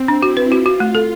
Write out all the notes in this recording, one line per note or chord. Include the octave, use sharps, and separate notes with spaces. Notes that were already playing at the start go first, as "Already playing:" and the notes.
Already playing: C4
D4
E4 F#4
B4
F4 F#4
F#4
A3
A4